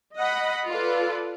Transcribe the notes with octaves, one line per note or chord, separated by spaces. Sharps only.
D#5 F#5 B5
F4 A4 B4 D5